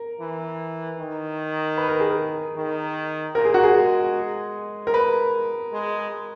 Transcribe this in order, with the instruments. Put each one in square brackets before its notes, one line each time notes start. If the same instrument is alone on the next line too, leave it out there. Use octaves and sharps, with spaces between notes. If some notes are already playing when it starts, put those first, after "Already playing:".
Already playing: [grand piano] A#4
[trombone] E3
D#3
[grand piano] B4
A#4
G#4
A#4
[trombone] D#3
[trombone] A#2 [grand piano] A#4
[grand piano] G#4
F#4
G#4
[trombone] G#3
[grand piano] A#4
B4
[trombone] G#3